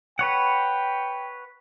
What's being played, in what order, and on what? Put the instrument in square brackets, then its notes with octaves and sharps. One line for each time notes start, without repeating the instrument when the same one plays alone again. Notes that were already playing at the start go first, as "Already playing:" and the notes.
[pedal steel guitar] B4 C#5 F#5 [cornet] G5